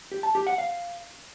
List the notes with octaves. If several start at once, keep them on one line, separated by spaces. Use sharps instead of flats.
G4
A5
G4
F#5
F5